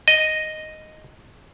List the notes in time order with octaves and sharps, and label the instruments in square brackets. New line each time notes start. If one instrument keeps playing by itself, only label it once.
[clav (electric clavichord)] D#5